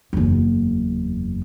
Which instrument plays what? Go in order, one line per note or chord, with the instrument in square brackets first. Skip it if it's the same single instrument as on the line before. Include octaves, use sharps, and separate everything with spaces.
[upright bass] F#1 E2